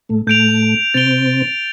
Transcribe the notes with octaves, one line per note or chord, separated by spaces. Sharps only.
A2 A3
A2 A3 G6 D7 F7
C3 C4 A6 D7 G7